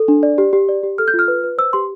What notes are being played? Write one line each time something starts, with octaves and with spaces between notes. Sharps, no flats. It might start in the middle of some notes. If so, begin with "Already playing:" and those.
Already playing: A4
D4
D5
G4
G4
D5
G4
A4 F6
G6
F4
F6
B4
B4
C5 E6
G4 C6